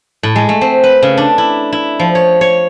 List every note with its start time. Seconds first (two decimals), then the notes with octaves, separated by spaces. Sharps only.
0.23 A2
0.36 G#3
0.49 A3
0.61 C4
0.84 B4
1.03 C#3
1.17 D4
1.38 E4
1.73 E4
1.99 F3
2.15 C#5
2.41 C#5